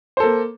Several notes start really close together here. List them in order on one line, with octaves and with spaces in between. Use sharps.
C5 A4 A#3